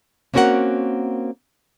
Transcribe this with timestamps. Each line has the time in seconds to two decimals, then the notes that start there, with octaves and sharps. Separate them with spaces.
0.34 A#3 C4 C#4 F#4 A#4 F#5